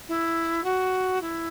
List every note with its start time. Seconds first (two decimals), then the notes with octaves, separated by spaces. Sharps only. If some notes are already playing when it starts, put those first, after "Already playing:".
0.08 E4
0.64 F#4
1.21 E4